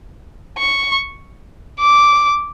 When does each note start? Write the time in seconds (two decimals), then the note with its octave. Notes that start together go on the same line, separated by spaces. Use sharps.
0.58 C#6
1.80 D6